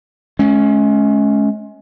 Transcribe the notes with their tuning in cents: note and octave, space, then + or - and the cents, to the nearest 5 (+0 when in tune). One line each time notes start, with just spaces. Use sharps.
G#3 +40 C#4 +0